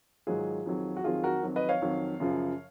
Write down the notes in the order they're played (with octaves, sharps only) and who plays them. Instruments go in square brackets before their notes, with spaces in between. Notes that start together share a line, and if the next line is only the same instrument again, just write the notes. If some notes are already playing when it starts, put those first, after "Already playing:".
[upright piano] G#2 D#3 F#3 F4 G#4
F2 D#3 F#3
F#4
F2 D#3 F#3 F4 G#4
F#4 A#4
F2 D#3 F#3
B4 D#5
C#5 F5
F2 D#3 F#3
F#2 C#3 F3